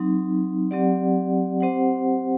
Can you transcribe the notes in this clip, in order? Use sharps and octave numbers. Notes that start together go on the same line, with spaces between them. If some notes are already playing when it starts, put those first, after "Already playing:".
Already playing: F#3 C4 D#4
F#3 C4 G4 D5 F#5
C4 G4 C5 F#5